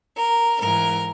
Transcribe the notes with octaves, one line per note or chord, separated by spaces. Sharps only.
A#4
G#2 E3 A#4